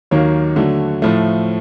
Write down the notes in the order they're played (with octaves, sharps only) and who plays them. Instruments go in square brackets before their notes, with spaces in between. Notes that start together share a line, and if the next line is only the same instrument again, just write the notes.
[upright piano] D#2 D#3 F#3 A#3 C#5
D3 F#3 A3
A2 F3 A3